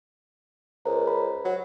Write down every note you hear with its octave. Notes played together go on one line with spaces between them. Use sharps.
C#2 A#4 C5 A#5
B5
F#3